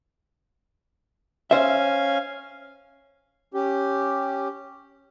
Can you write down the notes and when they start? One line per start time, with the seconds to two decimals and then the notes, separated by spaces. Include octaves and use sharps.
1.51 C#4 C5 E5 F5 G#5
3.54 C#4 G4